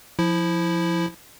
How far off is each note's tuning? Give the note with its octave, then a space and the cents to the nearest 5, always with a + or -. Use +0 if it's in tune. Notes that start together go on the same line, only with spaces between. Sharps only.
F3 +0 E4 +0